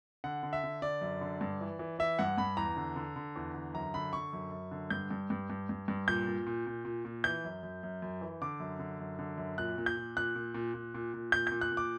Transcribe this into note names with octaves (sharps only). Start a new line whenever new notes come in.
D3 F#5
D3
E5
D3
D3 D5
F#2
D3
G2
E3
E3
E3 E5
G2 F#5
G2 B5
E2 A#5
D3
D3
D3
E2
D3
F#2 A#5
D3 B5
D3 C#6
F#2
F#2
D3
G2 G6
G2
G2
G2
G2
G2
A#2 G6
A#2
A#2
A#2
A#2
A#2
E3 G6
F#2
F#2
F#2
F#2
E3
D3 D6
F#2
D3
F#2
D3
F#2
A#2 F#6
A#2
G6
A#2
A#2 F#6
A#2
A#2
A#2
A#2
A#2
A#2 G6
A#2 G6
F#6
A#2
D6